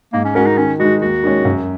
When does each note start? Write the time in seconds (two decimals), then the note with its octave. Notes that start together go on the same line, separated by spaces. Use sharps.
0.13 G#2 A#3
0.24 C#4
0.35 G#3 C#4 F#4 A#4
0.46 D#4
0.57 D#3 C#4
0.79 G#3 D#4 F#4
1.01 D#2 F#4
1.24 D#3 G#3 C#4
1.45 F#2